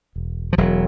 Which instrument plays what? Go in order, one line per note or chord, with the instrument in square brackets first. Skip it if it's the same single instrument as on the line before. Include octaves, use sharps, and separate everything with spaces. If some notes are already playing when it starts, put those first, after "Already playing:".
[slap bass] E1
F3
E1 F#3